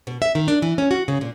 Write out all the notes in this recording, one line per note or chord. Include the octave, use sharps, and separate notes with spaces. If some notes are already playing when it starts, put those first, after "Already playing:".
B2
E5
D#3
D4
E3
C#4
F#4
C#3
A#2